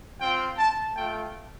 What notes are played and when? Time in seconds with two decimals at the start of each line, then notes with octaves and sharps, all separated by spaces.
0.21 C4 F4 G5
0.58 A5
0.96 A3 F4 G5